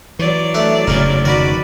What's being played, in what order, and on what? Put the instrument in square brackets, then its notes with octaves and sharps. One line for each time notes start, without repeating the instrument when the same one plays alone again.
[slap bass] E3 [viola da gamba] F#3 D5
[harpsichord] A3 D4 [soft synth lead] E5
[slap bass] F1 G#2 C#3 [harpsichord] D#4 G#4 [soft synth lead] F6
[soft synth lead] D#3 [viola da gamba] F#4 B4 D5 [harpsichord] A#4